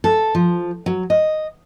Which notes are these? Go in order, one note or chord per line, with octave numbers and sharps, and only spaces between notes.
A4
F3
F#3
D#5